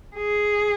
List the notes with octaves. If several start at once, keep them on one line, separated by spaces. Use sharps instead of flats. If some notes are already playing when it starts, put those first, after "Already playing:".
G#4